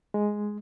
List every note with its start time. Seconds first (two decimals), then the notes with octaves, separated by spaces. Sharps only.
0.14 G#3